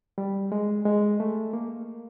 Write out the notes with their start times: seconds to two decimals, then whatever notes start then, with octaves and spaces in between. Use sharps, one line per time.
0.18 G3
0.52 G#3
0.85 G#3
1.20 A3
1.53 A#3